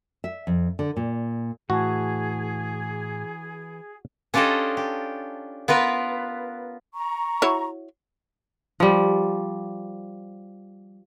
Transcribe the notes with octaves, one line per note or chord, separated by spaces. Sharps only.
E5
F2
D3
A#2
A2 E3 F#4 G#4 A5
C#4 D4 F4 G4 A4 D#5
G4
B3 F4 A#4 B4
A#5 C#6
E4 F#4 C#5
F3 G3